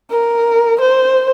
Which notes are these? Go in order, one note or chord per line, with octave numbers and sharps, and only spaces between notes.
A#4
C5